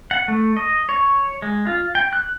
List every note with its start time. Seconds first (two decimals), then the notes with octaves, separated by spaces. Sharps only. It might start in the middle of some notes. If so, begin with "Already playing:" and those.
0.11 F#5
0.28 A3
0.56 D#5
0.89 C#5
1.42 G#3
1.67 F4
1.95 G5
2.13 F#6